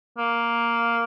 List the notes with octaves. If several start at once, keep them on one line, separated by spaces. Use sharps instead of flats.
A#3